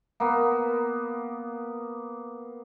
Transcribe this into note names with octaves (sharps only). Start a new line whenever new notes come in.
A#3 B3